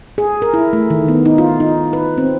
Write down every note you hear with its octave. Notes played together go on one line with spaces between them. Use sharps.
G#4
A#4
E4
A3
D#3
B3
D#4
F4
D#4
B4
C4